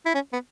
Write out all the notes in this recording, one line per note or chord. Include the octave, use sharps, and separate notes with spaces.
E4
C#4
B3